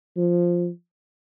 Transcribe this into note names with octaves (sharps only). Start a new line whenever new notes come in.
F3